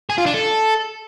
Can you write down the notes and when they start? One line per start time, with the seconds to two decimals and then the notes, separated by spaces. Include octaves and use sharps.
0.10 G#4
0.18 F4
0.26 D4
0.34 A4